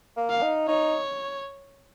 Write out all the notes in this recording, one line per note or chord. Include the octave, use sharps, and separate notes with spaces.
A#3
F5
D#4
D#4 C#5